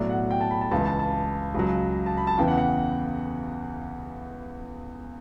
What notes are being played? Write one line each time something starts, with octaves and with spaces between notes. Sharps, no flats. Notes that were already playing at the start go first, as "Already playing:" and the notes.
Already playing: B1 A2 F#3 D5
F#5
G5
A5
B5
A5
C#2 C#3 E3 A5
A5
A5
C#2 C#3 F#3
A5
B5
A5
E2 C#3 E3 G5
F#5
F#5